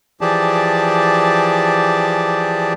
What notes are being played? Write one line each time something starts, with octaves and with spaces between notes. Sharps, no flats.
E3 F3 G4 G#4 D5 A5